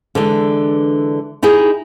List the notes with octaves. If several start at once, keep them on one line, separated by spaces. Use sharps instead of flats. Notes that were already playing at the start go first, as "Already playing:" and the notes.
D3 E3 G#3 D4
D#4 E4 G4 G#4